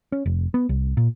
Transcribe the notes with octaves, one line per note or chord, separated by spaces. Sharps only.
C#4
F1
B3
C2
A#2